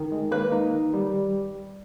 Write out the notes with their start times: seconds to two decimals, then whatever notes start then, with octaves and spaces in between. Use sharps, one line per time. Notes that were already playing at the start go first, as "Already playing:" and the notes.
Already playing: D#3
0.12 G#3
0.31 A#3 B4
0.52 D#4
0.73 D#3
0.93 G3